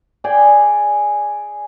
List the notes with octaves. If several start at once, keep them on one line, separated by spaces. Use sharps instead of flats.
G#4 D5 G5 G#5